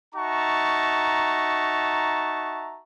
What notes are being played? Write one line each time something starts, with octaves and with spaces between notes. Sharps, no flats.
D#4 F#4 E5 A5 A#5 C#6